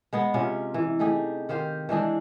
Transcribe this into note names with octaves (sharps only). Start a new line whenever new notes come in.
G#3 B3 G#4
C3 C#4 F4
E3
A3 D#4 G4 G#4
D#3 G4 C5 F5
E3 G#3 D4 G#4